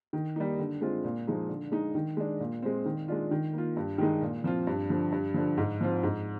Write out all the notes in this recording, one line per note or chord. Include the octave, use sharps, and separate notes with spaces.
D#3
G3 A#3 D#4
D3
G#3 C4 F4
A#2
F3 G#3 D#4
D3
G#3 D#4
D#3
G#3 D4
A#2
G#3 C4
D#3
G#3 D4 F4
D#3
A#3 F4
G2
D#3 G#3 D#4
A#2
F3 C4 F4
G2
D3 F3
G2
D3 F3
G#2
F3 C4 F4
G#2